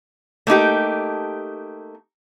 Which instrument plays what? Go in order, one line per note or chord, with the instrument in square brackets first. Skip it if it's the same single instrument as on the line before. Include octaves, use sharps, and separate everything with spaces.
[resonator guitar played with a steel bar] A3 A#3 D#4 G4